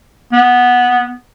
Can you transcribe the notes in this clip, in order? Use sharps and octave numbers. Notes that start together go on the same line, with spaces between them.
B3